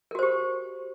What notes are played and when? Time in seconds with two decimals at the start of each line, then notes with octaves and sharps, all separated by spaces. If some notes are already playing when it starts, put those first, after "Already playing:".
0.11 A#4
0.15 F#4
0.19 C5
0.23 G4